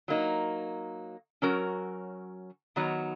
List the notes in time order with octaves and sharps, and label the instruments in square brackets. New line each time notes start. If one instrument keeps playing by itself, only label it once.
[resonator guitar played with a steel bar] F#3 A#3 D#4
F#3 C#4 F#4 A#4
D#3 F#3 B3 D#4